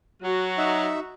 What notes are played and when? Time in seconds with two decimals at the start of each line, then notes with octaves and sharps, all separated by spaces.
0.22 F#3 F#4
0.58 D#4 E5